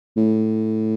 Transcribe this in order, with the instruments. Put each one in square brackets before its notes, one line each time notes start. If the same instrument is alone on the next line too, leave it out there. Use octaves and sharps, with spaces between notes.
[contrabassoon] A2